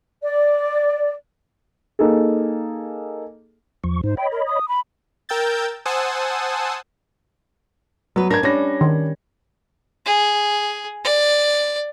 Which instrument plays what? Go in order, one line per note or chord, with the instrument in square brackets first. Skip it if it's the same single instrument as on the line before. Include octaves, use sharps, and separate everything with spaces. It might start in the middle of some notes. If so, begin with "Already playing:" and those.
[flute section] D5
[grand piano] A#3 D#4 G#4 A4
[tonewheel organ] E2 F3 C#6
[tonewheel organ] G#2 D#4 [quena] C5
[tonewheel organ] C#5 D#5 B5 [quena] G5
[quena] A#4
D#6
B5
[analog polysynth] A#4 G5 E6 G6 A6
C5 F#5 G#5 A5 D#6 E6
[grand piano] F#3 [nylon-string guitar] B3 B4
[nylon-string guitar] D4 A#4 [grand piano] G#6 A#6
[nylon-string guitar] G3 C#4 [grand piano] D4 A#6
[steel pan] D#3
[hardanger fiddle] G#4
D5